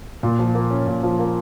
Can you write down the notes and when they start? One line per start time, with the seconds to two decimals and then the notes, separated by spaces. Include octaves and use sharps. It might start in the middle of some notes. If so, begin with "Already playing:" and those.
0.23 A#2
0.39 F3
0.54 A#3
0.70 C#4
0.87 A#2
1.03 F3
1.19 A#3